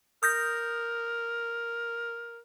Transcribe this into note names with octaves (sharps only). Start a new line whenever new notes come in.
A#4 D#6 G6 A#6